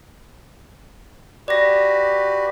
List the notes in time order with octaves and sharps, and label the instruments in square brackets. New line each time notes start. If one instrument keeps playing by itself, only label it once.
[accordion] F#4 G4 B4 [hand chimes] D5 A#6